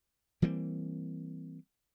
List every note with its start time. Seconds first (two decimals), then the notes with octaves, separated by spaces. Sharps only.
0.42 E3 G3 A#3 C4